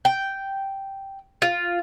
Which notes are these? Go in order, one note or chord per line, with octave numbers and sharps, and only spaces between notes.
G5
F4